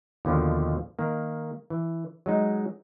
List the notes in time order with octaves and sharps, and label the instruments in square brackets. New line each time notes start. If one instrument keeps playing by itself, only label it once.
[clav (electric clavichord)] D#2 B2 D3 D#3 F3
D#3 A#3
E3
F#3 G#3 D#4